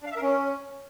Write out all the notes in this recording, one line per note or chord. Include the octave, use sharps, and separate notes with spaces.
D4
F5
E5
A#4
C#4